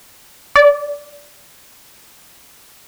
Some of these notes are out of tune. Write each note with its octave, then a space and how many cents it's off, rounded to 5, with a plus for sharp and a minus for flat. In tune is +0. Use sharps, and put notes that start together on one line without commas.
D5 -20